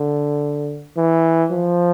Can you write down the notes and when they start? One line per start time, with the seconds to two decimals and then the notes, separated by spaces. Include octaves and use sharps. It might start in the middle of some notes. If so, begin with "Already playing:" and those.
Already playing: D3
0.97 E3
1.51 F3